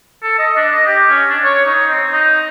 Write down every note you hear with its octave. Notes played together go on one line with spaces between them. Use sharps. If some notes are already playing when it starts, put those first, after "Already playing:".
A4
D#5
D4
D#5
G4
C#4
D4
C#5
D#4
C4
D#4